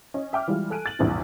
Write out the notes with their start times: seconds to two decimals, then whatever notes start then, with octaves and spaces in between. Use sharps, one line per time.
0.14 C#4 D#5
0.33 E5 G5 D6 F6
0.48 E3 G3 G#3 F4
0.70 A4 G#5 F#6 D7 D#7
0.86 A6 F#7
0.99 A#1 E2 G2 C3